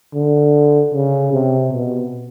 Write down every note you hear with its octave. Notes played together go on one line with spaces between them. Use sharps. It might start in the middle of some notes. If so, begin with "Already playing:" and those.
D3
C#3
C3
B2